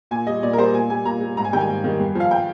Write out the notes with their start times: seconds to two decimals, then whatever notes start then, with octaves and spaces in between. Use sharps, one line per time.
0.11 A#2 G#5
0.27 G3 D#5
0.43 A#2 D5
0.53 A#4
0.58 G3 C5
0.74 A#2 G#5
0.90 G3 G#5
1.05 A#2 A#5
1.21 G3
1.37 G#2 A#5
1.44 G#5
1.53 D#3 G3 G5
1.60 G#5
1.69 G#2
1.84 D#3 G3
2.00 G2
2.15 F3 F5
2.31 G5